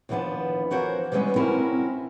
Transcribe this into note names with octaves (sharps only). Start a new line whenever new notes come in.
D#2 E3 F3 A#3 B3 D4
E3 F3 F#4 A#4 C5 C#5
E3 G3 G#3 A#3 B3 C#4
C4 C#4 E4 F#4 A#4